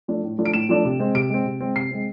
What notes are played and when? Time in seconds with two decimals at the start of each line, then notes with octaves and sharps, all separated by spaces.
0.08 F3 A3 D4
0.23 A2
0.38 F3 A3 D4
0.45 D7
0.54 A2 E7
0.69 F3 A3 D4
0.85 C3
0.99 G#3 C4
1.15 C3 D7
1.30 G#3 C4
1.46 C3
1.61 G#3 C4
1.76 C3 C7
1.91 G#3 C4